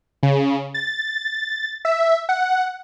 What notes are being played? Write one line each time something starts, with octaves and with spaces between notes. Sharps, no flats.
C#3
A6
E5
F#5